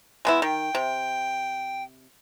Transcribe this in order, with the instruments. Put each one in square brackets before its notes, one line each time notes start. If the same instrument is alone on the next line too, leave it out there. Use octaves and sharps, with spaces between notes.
[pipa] G#3 B3 E4
[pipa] D#3 [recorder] G5
[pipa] C3